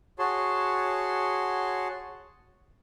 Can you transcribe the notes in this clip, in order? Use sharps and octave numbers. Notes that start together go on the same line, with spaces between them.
F#4 G#4 C#5 A5 C6